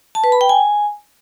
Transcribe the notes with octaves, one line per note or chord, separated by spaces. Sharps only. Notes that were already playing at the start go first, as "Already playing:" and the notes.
A5
B4
B5
G5
G#5